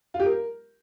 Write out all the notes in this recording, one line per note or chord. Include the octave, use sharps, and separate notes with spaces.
F4
G4
A#4